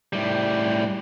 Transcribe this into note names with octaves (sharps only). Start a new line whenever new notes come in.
A2 G3